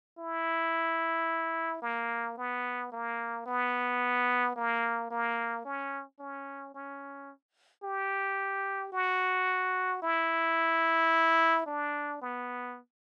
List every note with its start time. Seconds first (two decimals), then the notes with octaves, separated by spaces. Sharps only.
0.18 E4
1.82 A#3
2.37 B3
2.92 A#3
3.46 B3
4.56 A#3
5.10 A#3
5.65 C#4
6.19 C#4
6.74 C#4
7.83 G4
8.92 F#4
10.02 E4
11.66 D4
12.21 B3